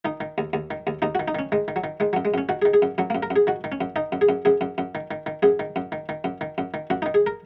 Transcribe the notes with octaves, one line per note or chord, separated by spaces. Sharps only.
D#3 D#4
D#3
D#2
D#2
D#3
D#2
D#2 D#4
D#3 F#4
D#4
D#3 C#4
D#3 G#3
D#3
F#3
D#3
D#3 G#3
F#2 F#3
G#3
F#2 C#4
D#3 F#4
G#4
D#3
G#4
F#2
F#2 F#3
F#2 A#3
A#4
F#2
G#4
D#3 F#4
D#3
C#4
F#2
D#3 D#4
F#2
G#4
F#2
F#2 G#4
F#2
F#2
D#3
D#3
D#3
F#2 G#4
D#3
F#2
D#3
D#3
F#2
D#3
F#2
D#3
F#2 F#4
D#3 D#4
G#4
A#4